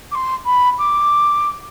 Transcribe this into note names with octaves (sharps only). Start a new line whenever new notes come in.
D6
C6
B5
D6